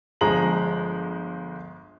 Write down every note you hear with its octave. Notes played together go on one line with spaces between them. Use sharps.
G1 F3 G#3 A#5 F#7